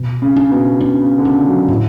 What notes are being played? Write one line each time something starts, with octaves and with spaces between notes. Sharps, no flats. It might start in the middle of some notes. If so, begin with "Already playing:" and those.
Already playing: B2
C#3
D4
B2
C#3 D4
C#3
D3
C#3 D4
F#3
A2 E4